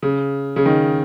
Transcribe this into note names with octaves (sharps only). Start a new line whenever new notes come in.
C#3
C#3
D#3